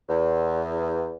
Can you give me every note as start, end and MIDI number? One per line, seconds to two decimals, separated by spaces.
0.09 1.15 40